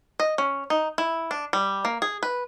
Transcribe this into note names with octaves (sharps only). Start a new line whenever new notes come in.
D#5
C#4
D#4
E4
D4
G3
A#3
G#4
B4